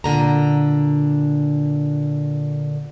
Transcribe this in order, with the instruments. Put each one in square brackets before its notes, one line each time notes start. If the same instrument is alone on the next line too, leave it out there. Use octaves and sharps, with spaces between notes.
[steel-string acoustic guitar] A#2 D3 A#5